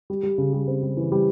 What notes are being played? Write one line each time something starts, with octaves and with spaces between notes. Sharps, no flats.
G3
G3
C#3
G3
C4
G3
E3
G3